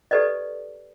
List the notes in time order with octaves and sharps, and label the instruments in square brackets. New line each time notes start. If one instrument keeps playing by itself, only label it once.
[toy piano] G4 A4 B4 D5 D#5